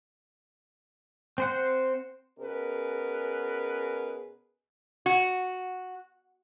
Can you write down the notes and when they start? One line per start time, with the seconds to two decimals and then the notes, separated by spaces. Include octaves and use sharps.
1.38 C4 C5 F#5
2.39 B2 C#4 G#4 A#4 B4
5.06 F#4